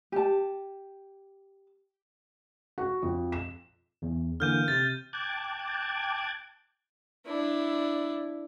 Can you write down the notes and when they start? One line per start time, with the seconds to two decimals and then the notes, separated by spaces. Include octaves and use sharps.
0.12 G4 A5
2.78 F#4
3.03 F2
3.32 E7
4.02 E2
4.40 D3 E3 A#3 F6 G6 D#7
4.68 C3 A6
5.13 G5 A5 D6 F#6 G#6
7.26 D4 E4